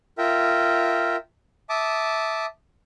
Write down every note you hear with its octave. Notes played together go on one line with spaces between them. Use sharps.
F4 A#4 E5 G5
E5 A5 D6 D#6